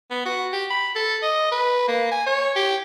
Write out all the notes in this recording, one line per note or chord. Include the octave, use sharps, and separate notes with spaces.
B3
F#4
G4
B5
A4
D#5
B4
A#3
G#5
C#5
G4